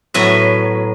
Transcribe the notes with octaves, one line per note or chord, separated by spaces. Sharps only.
A2 F#3 B3 E5